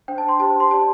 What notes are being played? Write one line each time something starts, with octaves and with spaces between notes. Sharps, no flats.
D4 C5 G5
A5
C6
G4 C5 A5
C6
G4 D5 A5